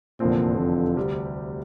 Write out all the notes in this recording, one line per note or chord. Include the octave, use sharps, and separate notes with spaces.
F1 E2 A#2 D3 F3 C4
F2
D2 C3 G3